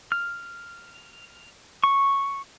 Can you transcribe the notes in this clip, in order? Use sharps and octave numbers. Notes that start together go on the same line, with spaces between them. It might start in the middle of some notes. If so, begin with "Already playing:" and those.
F6
C#6